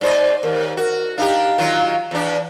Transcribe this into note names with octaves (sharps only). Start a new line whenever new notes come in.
G#2 C5 D5 D#5
D#2 A#4
F#4 A#4
D4 D#4 G4 F5
D#3 F#3 F4
E2 D4